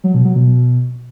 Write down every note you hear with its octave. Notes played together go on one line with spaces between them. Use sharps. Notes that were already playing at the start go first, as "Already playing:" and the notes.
F#3
B2
F#3
B2